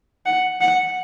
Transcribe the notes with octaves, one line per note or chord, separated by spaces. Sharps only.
F#5
F#5